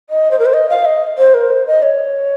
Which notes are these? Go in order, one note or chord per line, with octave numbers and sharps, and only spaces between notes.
D#5
C5
A#4
C5
D#5
F5
D#5
C5
A#4
C5
D#5
C#5